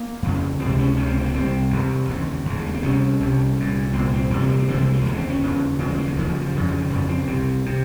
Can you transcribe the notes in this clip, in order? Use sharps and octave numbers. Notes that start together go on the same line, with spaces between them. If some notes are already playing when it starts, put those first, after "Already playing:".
Already playing: A#3
F2 C#3
C#2 C3 C4
C#4
C#2 C3 C#4
C4
A#3
C2 C3 C4
C2 C3
D#2 C#3
D#2 C#3
G#3
A#3
C4
C2 C3 C#4
C2 C3
C2 A#2
C2 A#2 C4
C4
C2 C3 A#3
F3
F#3
C4
C2 C3 A#3
G#3
F3
D#2 C#3 G#3
C4
C#4
D#2 C#3
D#2 C#3 C4
G#3
A#3
F#3
D#2 C#3 F3
F3
F3
F2 C#3
F3
D#3
F2 C#3 F3
C4
C2 C3
C3